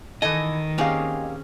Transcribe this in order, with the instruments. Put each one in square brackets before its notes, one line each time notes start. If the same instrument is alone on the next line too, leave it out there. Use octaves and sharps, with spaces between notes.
[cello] D#3 [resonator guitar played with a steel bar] E3 G#5 [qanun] A4 [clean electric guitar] D#5
[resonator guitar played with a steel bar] A#3 G4 F5 [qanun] C4 C#4 G#4